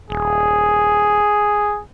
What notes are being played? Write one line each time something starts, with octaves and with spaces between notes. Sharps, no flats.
D#1 G#4